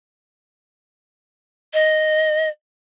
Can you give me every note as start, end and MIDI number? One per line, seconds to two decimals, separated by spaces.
1.74 2.49 75